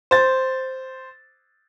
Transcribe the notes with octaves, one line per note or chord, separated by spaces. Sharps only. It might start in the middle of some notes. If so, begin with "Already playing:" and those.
C5 A6